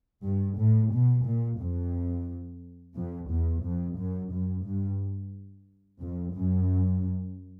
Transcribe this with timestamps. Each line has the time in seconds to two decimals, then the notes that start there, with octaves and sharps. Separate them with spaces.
0.24 G2
0.59 A2
0.93 B2
1.26 A#2
1.60 F2
2.95 F2
3.30 E2
3.63 F2
3.98 F#2
4.31 F#2
4.65 G2
6.00 F2
6.34 F#2